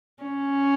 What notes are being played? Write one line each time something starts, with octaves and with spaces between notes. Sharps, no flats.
C#4